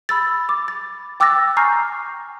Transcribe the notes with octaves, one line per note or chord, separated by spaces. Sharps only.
B5 E6 A6
D6
A6
G5 D6 E6 F#6 A6 A#6
G#5 A#5 C#6 F6 G6 C7